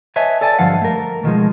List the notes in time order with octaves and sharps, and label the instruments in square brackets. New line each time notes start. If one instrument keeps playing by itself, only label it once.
[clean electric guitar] B4 C#5 D#5 E5 G#5 A5
A4 D5 G#5 A5
G2 D3 F3 F5 F#5
A3 A#4
B2 D#3 F3 G#3